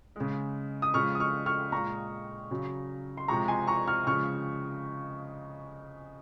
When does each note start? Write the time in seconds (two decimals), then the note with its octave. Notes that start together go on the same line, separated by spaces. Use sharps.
0.16 C#3 G#3
0.82 D#6
0.94 C#3 F3 G#3 C#6 F6
1.15 D#6
1.20 C#6 F6
1.46 C#6 F6
1.72 A#2 G#3 A#5 C#6
2.51 C#3 F#3
3.17 C6
3.28 C3 F3 G#3 A#5 C#6
3.48 G#5 C6
3.67 A#5 C#6
3.87 C#6 F6
4.07 C#3 F3 G#3 C#6 F6